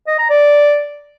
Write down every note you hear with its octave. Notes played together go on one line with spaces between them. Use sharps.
D#5
A#5
D5